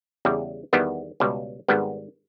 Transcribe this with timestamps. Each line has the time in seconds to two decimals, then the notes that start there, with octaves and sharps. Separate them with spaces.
0.25 E2 C#3 G3
0.73 E2 D#3 G3 B3
1.20 C#2 B2 G3
1.68 G#1 G#2 G3 B3